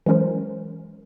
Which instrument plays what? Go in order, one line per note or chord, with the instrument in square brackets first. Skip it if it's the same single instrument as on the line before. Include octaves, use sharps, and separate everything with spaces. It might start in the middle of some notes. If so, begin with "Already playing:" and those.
[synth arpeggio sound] E3 F#3 G#3 C#4 A#4 C5